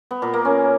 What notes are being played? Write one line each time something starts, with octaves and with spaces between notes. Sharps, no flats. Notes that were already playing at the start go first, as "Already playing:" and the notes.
B3
A#2
A#3
C#4